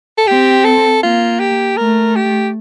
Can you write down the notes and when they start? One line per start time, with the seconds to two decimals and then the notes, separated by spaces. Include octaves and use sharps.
0.18 A4
0.27 C4 G4
0.65 A4
1.03 A#3 F4
1.40 G4
1.77 A3 A#4
2.16 G4